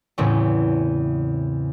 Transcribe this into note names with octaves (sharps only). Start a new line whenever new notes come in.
E2 A2 C#3 C4 C#4